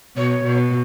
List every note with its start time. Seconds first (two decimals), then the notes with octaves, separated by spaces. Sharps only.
0.17 B2 C#5
0.45 B2